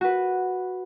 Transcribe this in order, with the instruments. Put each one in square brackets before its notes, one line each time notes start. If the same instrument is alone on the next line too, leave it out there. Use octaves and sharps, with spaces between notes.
[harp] F#4 B4